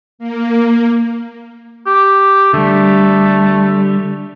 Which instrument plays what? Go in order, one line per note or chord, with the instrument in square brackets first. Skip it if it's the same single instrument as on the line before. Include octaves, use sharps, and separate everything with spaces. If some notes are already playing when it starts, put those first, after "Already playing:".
[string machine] A#3
[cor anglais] G4
[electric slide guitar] D3 G3 [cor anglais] A3